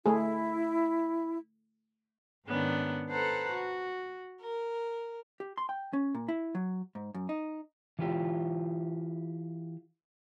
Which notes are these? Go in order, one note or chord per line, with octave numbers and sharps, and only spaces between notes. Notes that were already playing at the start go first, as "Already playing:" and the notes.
A3 E4 G#4
G#2 D#3 B3 C#4 D4
A4 B4 C5 F#5 A5 A#5
F#4
A#4
G4
C6
G5
C#4
A#2
E4
F#3
G#2
F#2
D#4
E3 F4 G4